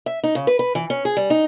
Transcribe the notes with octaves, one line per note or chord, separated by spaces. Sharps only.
E5
D#4
C#3
B4
B4
E3
C#4
G#4
G3
D#4